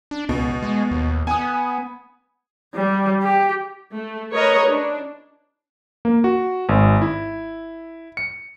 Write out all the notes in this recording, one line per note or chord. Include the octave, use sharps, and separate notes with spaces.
D4
C#2 B2
G#3
D#2
B3 G#5 D#6
G3
G4
A3
A#4 B4 C#5 D#5 A#5
D4
A#3
F#4
G#1
E4
C#7